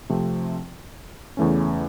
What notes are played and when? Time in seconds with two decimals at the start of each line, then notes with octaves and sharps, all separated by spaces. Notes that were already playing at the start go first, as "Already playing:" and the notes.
0.09 C3 F3 A3 C4
1.37 E2 C#3 E3 A3 C#4